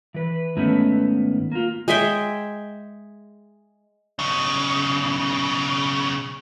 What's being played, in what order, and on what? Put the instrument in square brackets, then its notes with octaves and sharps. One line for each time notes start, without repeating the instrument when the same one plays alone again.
[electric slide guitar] E3 B4
G#2 D#3 A3 B3 C#4 E4
A#3 F4
[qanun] G#3 G#4 E5 G5
[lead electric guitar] B1 C#3